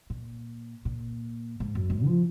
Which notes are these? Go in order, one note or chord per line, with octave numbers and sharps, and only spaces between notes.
A#2
A#2
G#2
F#2
G#2
F3